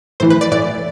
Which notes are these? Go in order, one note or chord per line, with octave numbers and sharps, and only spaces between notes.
A2 E3 C5
B4
D5
A2 E3 D5